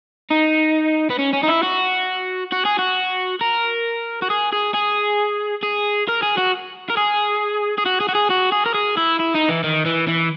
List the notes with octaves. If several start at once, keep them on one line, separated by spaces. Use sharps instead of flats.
D#4
B3
C#4
C#4
D#4
E4
F#4
F#4
G#4
F#4
A#4
F#4
G#4
G#4
G#4
G#4
A#4
G#4
F#4
A#4
G#4
G#4
F#4
G#4
F#4
G#4
F#4
G#4
A#4
G#4
E4
E4
D#4
E3
D#3
E3
E3